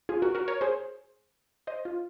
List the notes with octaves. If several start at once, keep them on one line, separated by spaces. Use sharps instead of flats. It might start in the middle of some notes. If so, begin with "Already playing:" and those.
F4 G#4
F#4 A#4
F#4 A#4
A#4 C#5
G#4 C5
C5 D#5
F4